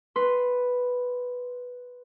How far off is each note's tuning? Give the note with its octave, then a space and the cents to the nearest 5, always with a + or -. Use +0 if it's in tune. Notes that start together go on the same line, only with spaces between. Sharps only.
B4 +0 C6 -5